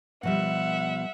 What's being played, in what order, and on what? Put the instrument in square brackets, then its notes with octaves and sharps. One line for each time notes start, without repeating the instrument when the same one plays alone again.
[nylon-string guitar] B2 F3 G3 [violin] E5 F#5